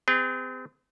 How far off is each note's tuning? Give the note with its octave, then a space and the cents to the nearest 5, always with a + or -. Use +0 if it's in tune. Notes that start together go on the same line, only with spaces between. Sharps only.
C4 -40 G#4 -40